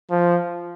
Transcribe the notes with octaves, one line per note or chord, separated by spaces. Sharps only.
F3